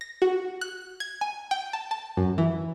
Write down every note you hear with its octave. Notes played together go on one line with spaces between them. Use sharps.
A#6
F#4
F#6
G#6
G#5
G5
A5
A5
F#2
E3